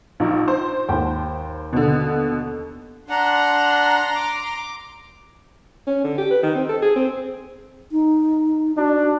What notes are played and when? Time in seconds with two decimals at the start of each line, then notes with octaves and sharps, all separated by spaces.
0.20 A#1 D#4 F4
0.48 C5
0.89 D#2 G5 B5
1.73 B2 D3
3.09 D4 F#5 A#5 C6
4.16 D6
5.87 C#4
6.04 D3
6.18 G4
6.31 B4
6.43 D#3
6.55 C4
6.69 A4
6.82 G#4
6.96 C4
7.92 D#4
8.77 D4 F#4